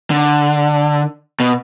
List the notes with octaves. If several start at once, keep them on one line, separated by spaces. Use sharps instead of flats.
D3
B2